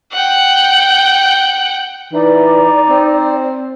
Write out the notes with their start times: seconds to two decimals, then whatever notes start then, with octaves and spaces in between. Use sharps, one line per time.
0.12 F#5 G5
2.13 E3 D#4 D5
2.89 C4